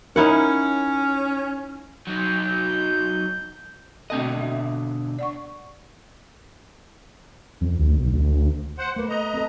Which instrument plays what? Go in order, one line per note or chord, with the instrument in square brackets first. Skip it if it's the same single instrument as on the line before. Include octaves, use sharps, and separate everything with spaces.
[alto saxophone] C#4 [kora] D#4 E4 F#5 [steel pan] A#4
[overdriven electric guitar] F#3 D#4 [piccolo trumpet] G6
[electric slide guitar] B2 D3 D#5 [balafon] A3 C4 A4
[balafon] E5
D5 F#5 C#6
[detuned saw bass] F2
D2
B1
D2
[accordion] C5 F#5
[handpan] A3 B4 [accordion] A#3
[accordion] D#5 A#5
[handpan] C4 A4